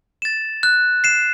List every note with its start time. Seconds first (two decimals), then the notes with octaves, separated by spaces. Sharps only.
0.22 A6 E7
0.63 F#6
1.04 C7 E7